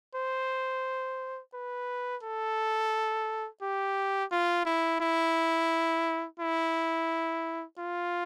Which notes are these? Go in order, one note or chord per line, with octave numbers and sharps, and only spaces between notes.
C5
B4
A4
G4
F4
E4
E4
E4
F4